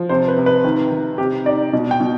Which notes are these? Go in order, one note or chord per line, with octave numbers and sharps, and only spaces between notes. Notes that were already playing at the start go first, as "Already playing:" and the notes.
Already playing: F3
C3 C5
B4
C3
B4
D#3
D#3
C3 G4
D#4 D5
B2 D#5
G5
B2